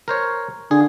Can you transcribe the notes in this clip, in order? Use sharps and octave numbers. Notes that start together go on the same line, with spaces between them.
A#4 C5 C#5
D3 G#4